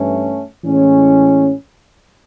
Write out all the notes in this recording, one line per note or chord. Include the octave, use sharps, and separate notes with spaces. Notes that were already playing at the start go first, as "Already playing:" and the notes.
Already playing: G2 E3 A3 C#4
A2 E3 G#3 C#4